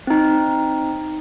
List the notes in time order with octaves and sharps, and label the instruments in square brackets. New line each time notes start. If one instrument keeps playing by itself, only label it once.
[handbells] C4 D#4